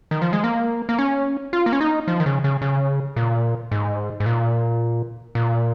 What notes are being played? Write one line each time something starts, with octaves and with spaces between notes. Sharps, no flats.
D#3
F3
G#3
A#3
A#3
C#4
F4
A#3
C#4
D#4
F3
D#3
C#3
C#3
C#3
A#2
G#2
G#2
A#2
A#2